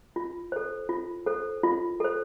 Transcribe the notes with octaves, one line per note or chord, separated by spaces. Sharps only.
F4
A4 C5
F4
A4 C5
F4
A4 C5